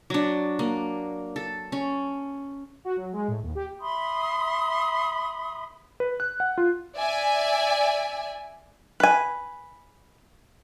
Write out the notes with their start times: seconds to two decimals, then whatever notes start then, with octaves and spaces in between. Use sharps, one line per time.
0.10 F#3 D4
0.59 A#3
1.36 A4
1.72 C#4
2.85 F#4
2.97 F#3
3.13 G#3
3.28 A2
3.43 D#2
3.55 G4
3.79 E5 B5 C6 D#6
6.00 B4
6.20 F#6
6.40 F#5
6.58 F4
6.95 D5 E5 G#5
9.00 B4 G#5